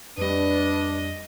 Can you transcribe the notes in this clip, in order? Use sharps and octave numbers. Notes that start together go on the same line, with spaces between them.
F2 G3 D4 B4 D#5